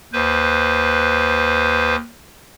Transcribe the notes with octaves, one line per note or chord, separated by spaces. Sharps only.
D#2 B4 C5